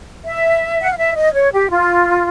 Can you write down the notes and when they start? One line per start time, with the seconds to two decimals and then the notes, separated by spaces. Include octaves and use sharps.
0.24 E5
0.81 F#5
0.89 F5
0.98 E5
1.16 D#5
1.34 C#5
1.53 G4
1.71 F4